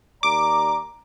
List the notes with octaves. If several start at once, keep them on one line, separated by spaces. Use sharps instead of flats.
D#2 D5 A#5 D6